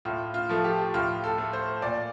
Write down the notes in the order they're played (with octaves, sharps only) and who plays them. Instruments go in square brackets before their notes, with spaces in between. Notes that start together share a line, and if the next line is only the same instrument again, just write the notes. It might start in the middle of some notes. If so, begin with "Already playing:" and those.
[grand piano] A2 F4
F4
F3 A3
G4
A2 F4
A4
A3
C5
A#2 D5